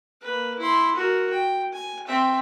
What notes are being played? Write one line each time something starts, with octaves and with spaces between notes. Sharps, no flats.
A#3 B4
E4 C6
F#4 A#4
G5
G#5
C4 E5